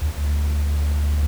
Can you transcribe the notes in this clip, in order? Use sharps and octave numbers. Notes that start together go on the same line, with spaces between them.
D2